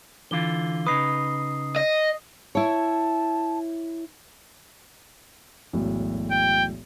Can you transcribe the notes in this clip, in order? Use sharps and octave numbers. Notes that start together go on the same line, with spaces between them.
D3 E3 F4 G7
C#3 D#4 B4 D#6 C7
D#5
E4 C#5 A5
E1 B1 A2
G5